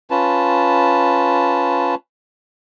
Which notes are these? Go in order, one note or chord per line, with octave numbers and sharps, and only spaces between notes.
C#4 F4 B4 A5